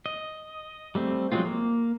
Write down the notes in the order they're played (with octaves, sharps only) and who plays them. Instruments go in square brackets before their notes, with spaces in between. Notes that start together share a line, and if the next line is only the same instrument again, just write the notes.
[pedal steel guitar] D#5
G3 A3 C4
F3 F#3 G#3 C4 F4
A#3